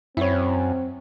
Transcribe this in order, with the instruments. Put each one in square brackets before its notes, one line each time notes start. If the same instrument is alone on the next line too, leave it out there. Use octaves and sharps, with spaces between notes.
[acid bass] F#2 [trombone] C4 [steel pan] E4 C#5